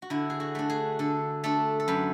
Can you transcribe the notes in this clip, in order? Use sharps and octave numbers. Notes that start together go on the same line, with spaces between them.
F#4
D3 E4
G#4
F#4
A3 D4
G#4
D3 A4
A3 D4 A4
A4
F#2 B4